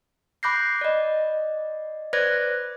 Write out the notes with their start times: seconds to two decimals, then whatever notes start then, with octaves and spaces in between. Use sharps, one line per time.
0.43 B5 D6 F#6 G6 A#6 C7
0.81 D5 D#5
2.13 B4 C5 D5 F#6 G#6 A#6